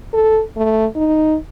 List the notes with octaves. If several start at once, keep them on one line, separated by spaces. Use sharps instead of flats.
A4
A3
D#4